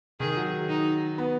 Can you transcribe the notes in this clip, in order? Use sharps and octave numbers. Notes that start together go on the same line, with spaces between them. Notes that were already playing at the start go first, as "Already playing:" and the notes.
D#3 G#4
F#3
D#4
B3